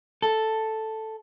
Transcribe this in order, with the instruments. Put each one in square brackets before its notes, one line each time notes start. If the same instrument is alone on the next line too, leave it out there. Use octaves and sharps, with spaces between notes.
[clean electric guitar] A4